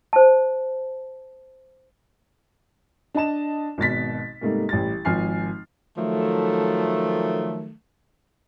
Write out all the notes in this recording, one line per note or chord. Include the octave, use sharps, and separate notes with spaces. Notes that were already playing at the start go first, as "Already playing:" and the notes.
C5 A5
D4 D#5 A5 E7
G#1 B2 A6 B6
G#2 C3 G3 A3 A#3 D#4
A1 G3 A6
G#1 F3 G#5 F6 C7
D#3 F3 F#3 A3